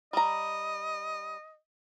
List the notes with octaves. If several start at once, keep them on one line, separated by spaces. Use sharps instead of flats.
G3 D#5 A#5